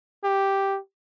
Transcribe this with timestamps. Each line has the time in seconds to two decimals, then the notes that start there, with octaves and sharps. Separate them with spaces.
0.24 G4